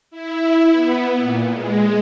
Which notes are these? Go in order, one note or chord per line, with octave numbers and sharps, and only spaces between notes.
E4
B3
A#2
G#3